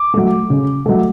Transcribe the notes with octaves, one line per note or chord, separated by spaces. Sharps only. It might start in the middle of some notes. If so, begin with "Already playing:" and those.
Already playing: D6
F#3 A3
C#3
F#3 A3